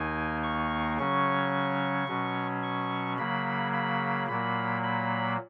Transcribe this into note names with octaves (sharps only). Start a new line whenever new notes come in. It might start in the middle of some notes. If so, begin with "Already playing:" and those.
Already playing: D#2 D#3 A#3 D#4 G#5
C#6
C#3 F#3 C#4 C#6
B2 F#3 C#4
C#6
C#3 F#3 A#3 B5
B5
A#2 F#3 A#3 B5
B5